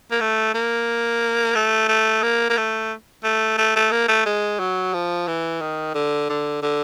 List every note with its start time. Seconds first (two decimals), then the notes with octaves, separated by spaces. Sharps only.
0.11 A#3
0.20 A3
0.54 A#3
1.55 A3
1.88 A3
2.23 A#3
2.50 A#3
2.57 A3
3.24 A3
3.58 A3
3.76 A3
3.91 A#3
4.08 A3
4.26 G#3
4.59 F#3
4.94 F3
5.28 E3
5.61 D#3
5.94 D3
6.29 D3
6.62 D3